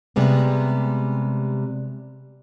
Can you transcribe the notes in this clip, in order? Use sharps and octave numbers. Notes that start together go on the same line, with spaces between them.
C3 G3 G#3 B3